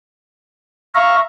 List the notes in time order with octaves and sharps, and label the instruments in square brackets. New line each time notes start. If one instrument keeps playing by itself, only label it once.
[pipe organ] E5 F5 A#5 [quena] C#6